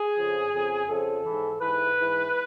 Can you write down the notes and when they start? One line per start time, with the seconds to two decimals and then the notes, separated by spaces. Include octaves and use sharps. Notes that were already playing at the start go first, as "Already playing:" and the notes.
Already playing: G#4
0.16 F2 C#3 F3
0.53 F2 C#3 F3
0.88 F2 C#3 F3 A4
1.25 G#2 E3
1.61 G#2 E3 B4
1.97 G#2 E3